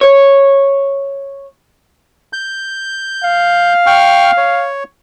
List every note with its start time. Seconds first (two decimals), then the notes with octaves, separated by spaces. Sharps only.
0.01 C#5
2.33 G6
3.24 F5
3.86 G5 C#6 F6
4.37 C#5